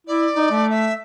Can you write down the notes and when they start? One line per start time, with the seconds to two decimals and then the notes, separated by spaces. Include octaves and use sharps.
0.07 E4 D5
0.36 D#4
0.51 A3
0.70 E5